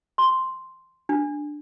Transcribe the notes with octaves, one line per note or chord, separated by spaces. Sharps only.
C6
D4